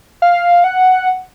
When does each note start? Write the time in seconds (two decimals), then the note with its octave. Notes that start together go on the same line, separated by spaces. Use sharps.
0.22 F5
0.64 F#5